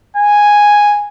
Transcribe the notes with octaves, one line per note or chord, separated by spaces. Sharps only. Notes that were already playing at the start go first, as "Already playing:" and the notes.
G#5